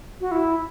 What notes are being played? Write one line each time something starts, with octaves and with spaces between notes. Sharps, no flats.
F#4
E4